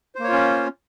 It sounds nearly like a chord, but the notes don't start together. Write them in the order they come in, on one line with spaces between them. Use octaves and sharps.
C5 A#3 C#5 F4 C#4